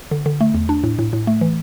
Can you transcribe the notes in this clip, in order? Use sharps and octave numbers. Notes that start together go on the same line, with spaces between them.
D3
D3
A3
E2
D4
A2
A2
A2
A3
E3